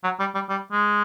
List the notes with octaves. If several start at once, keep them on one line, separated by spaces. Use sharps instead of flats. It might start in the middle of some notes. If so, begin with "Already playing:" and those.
F#3
G3
G3
G3
G#3